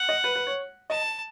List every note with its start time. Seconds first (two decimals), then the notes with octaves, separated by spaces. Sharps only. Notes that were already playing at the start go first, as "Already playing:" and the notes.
Already playing: F#5
0.09 D#5
0.24 B4
0.35 B4
0.47 C#5
0.90 D#5 A5